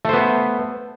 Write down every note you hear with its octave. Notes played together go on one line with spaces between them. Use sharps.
A3 B3 C5